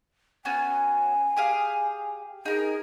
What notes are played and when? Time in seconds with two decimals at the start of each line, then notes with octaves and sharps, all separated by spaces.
0.45 B3 C#4 F#4 G#5
1.37 G4 G#4 F5
2.45 D#4 G#4 A#4